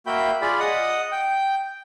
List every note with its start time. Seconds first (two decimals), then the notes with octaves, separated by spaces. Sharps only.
0.06 A#3 F#4 E5 G5 B5 G6
0.42 F4 G#4 D5 B5
0.60 D#5 F#5 D#6
1.12 G5